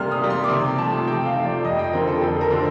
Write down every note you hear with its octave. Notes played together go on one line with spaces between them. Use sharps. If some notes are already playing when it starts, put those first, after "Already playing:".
Already playing: C3 G3 A#3 C6 F6
D#6
G3 A#3
C6
D6
C3 C6
F3 A3 A5
C3 G5
F5
F3 A3
D5
F2 D#5
G5
D3 F3 C4 A#4
A4
F2 A4
A#4
D3 F3 C4